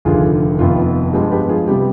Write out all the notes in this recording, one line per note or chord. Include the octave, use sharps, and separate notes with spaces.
F1 D#2 D3 F4 G#4
F1 F2 D#3 B3 F4
G2 F3 G#3 B3 G4
G4 B4
F4 G#4
C3 G3 B3 G4